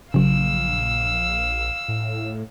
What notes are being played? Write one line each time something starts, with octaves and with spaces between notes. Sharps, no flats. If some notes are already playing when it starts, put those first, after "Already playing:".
A#1 C#3 F#3 F5 E6
A2